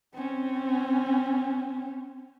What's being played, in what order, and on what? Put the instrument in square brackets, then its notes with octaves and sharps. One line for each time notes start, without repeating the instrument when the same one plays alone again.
[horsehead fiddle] C4 C#4